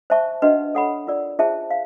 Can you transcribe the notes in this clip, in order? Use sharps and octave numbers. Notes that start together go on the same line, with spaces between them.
C5 E5 A5 C#6
D4 F#4 B4 D#5 F#5
A4 C#5 F#5 B5
F4 A#4 D5
F4 G#4 C5 E5 A5
F5